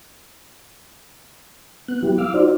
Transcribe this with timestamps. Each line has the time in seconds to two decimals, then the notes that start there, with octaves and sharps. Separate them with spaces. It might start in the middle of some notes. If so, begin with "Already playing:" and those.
1.88 B3 F#6
2.03 F#3 B3 E4 G4
2.18 F5 D6 E6 F6
2.33 D#4 F4 F#4 C5 D5